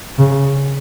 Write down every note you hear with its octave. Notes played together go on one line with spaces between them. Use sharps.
C#3